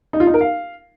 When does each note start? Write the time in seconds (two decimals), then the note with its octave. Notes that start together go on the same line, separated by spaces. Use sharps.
0.13 D#4
0.20 F4
0.27 D#4
0.34 A#4
0.41 F5